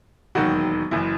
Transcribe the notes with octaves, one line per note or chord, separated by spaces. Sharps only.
E1 D#2 D#3 F#3 F#4
F#1 F#2 E3 E4